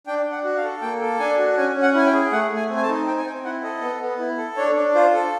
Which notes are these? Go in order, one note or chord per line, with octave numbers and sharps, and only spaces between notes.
D4 G5
D4
F#5
F#4
F5
A4
A#3 G5
A4
D4 G#5
F#4
C#4 G#5
C#4
F#5
E4 G#5
G5
G#4
A3 F#5
A3
G#5
C4
G#5
A5
D#4
C4 G5
G#5
C4 G5
E4 F#5
A4 D#5
B3
B3
E4
A4
D4 C#5
D4
F4 C5
A4